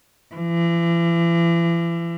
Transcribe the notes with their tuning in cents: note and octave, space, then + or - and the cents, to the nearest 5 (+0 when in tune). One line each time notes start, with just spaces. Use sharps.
E3 +40